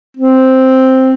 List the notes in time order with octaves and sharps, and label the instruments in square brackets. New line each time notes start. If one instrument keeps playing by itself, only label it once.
[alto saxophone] C4